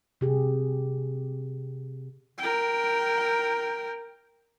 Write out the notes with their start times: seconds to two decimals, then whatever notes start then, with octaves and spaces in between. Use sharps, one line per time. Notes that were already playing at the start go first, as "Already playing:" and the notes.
0.21 C3 G4 G#4
2.38 A#4 G5